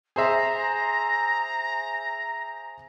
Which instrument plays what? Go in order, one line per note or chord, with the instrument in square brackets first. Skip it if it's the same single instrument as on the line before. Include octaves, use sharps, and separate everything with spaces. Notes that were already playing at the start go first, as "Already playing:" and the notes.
[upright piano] G#4 C5 E5 [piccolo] A#5